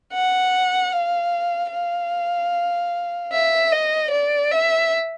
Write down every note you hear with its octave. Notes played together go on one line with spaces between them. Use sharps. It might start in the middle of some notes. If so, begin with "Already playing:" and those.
F#5
F5
F5
E5
D#5
D5
E5